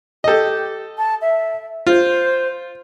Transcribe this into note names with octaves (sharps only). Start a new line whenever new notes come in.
G4 A4 D#5
A5
E5
F4 C5